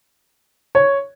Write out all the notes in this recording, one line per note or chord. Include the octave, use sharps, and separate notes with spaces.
C#5